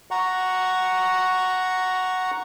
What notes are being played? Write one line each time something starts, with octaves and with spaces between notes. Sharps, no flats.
F#5 A#5 C#6